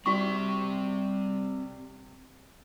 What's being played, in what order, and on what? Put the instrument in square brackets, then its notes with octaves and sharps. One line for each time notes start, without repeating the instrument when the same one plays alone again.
[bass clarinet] G3 [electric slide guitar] C4 G4 [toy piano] F#4 C#6